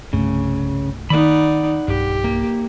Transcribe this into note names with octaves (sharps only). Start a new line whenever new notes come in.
C2 G2 C#3 A3
D#3 A#3 D#4 D5 F#5 B5
B1 G2 G4
A#3